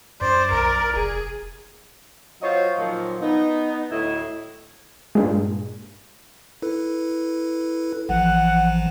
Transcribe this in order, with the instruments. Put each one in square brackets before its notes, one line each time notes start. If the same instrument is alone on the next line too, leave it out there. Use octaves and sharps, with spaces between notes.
[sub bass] F#2 [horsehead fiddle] C5 [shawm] D5
[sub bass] B1 [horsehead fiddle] A#4
[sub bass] F1 [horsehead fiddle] G#4
[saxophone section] F#3 F4 C5 C#5 D#5
A#2 D#3 F3 F#3
B3 D#4
D2 A2 E4 D#5
[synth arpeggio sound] G2 A#2 G#3
[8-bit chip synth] E4 A4 B4
[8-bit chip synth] A1 E3 F3 [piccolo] F#5